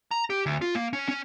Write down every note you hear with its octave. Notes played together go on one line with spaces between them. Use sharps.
A#5
G4
D2
F4
A#3
C#4
C#4